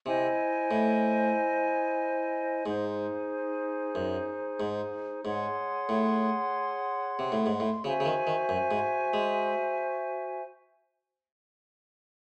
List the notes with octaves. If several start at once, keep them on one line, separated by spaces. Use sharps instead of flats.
C3 E4 C5 D#5 G#5
A2
G#2 D#4 G#4 C5
F#2
G#2
G#2 G#4 C#5 F#5 C6
A2
C3
A2
G#2
A2
C#3 F#4 C5 E5 G#5
C#3
D#3
D#3
F#2
G#2
G#3